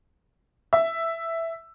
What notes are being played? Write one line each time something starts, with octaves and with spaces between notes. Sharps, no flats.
E5